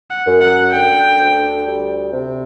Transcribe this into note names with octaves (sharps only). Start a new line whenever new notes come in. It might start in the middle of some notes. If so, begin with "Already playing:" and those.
F#5
F#2
F#5
D3 G5
D2
G3
C3